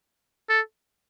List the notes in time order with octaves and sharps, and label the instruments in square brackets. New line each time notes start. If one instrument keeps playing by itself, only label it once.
[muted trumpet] A4